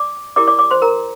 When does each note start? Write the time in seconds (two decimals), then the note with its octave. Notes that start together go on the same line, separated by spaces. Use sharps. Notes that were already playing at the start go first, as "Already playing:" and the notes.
Already playing: D5 D6
0.36 E4 G4 A#4 D5 D6
0.48 D5 D6
0.59 D5 D6
0.71 C5 C6
0.82 A#4 A#5